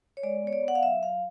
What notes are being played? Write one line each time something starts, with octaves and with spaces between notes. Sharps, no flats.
C#5
G#3 D5
B3 C#5
D5
B3
F#5
F5
F#3 E5
F#3 F5